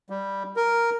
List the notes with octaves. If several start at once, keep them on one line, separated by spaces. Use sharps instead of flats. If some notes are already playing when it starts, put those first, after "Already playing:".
G3
A#4